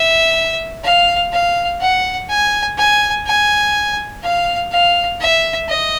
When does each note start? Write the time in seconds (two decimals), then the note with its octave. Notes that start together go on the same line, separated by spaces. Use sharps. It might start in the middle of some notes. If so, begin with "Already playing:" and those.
Already playing: E5
0.84 F5
1.32 F5
1.81 F#5
2.29 G#5
2.78 G#5
3.26 G#5
4.23 F5
4.71 F5
5.20 E5
5.69 D#5